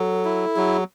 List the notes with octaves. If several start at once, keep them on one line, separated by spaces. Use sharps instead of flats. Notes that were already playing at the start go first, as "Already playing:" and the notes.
Already playing: F#3 A4
E4
F#3 G#4